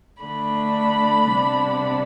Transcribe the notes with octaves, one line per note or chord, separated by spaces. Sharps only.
D3 A3 D4 B5
C3 G3 B3 D4